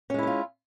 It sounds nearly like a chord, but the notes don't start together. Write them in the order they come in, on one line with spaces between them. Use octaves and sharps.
C#4 G#3 E4 B3 F4